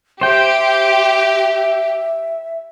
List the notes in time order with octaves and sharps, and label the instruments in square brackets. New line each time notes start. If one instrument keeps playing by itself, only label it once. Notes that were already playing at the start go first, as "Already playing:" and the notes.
[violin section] G4 [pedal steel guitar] C5 G5 [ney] E5